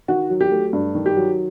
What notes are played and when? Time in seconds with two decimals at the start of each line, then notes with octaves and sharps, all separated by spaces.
0.08 D#3 F#4
0.30 F#3
0.41 G4
0.51 A3
0.73 G2
0.95 D#3
1.06 G4
1.16 F#3